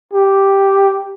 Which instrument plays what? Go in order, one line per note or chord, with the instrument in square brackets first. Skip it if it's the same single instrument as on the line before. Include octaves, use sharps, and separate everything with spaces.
[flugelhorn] G4